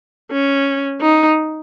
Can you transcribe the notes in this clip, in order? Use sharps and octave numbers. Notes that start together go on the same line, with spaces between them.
C#4
D#4